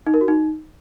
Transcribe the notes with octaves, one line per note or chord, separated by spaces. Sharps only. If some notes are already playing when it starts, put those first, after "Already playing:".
D#4
A#4
F#4
D#4